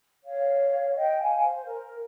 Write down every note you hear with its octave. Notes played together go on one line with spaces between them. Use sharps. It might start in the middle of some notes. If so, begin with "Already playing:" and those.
C#5 F5
D#5 G5
F5 G#5
C5
A#4